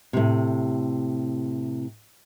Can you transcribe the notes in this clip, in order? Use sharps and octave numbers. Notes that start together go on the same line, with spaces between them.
A2 C3